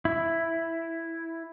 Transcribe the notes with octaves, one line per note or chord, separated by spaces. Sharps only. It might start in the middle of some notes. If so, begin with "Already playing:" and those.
E4